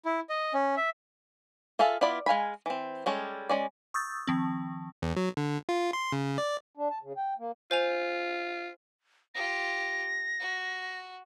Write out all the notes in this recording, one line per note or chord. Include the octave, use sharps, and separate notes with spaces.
E4
D#5
C#4
E5
F4 G#4 A4 E5 F5
B3 E4 F4 D5 B5
G#3 F5 G#5 B5
E3 C4
G3 G#3 C#4 A4
G#3 C#4 D5
C#6 D#6 E6 G6 A6
D#3 F3 C4
E2
F#3
D3
F4
C6
C#3
D5
D4
A5
C#3
G5
A#3
F4 C5 G#5 F7
F4 G4 A#6
F#4